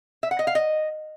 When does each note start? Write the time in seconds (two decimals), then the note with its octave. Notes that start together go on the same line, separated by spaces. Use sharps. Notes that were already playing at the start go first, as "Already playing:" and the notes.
0.23 E5
0.31 F#5
0.39 D#5
0.47 F5
0.55 D#5